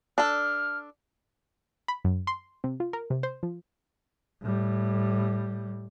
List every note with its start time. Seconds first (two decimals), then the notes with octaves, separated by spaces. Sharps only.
0.18 D4 A4 F6
1.88 B5
2.05 F#2
2.27 C6
2.64 C3
2.80 F4
2.93 A#4
3.10 C3
3.23 C5
3.43 F3
4.42 A2 G3